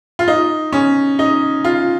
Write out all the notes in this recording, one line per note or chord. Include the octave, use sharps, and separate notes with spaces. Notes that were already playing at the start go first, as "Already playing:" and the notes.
F4
D#4
C#4
D#4
F4